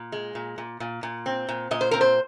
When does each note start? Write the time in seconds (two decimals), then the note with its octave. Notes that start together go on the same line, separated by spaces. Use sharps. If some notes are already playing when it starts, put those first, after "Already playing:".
Already playing: A#2
0.12 G#3
0.35 A#2
0.58 A#2
0.80 A#2
1.03 A#2
1.26 C4
1.49 A#2
1.71 A#2 D#5
1.81 C5
1.91 C4 A#4
2.01 C5